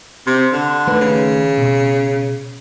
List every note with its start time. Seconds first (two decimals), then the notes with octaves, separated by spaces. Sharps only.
0.27 C3 C6
0.52 D3
0.87 D#3 A3 B4
1.01 C#3
1.58 B2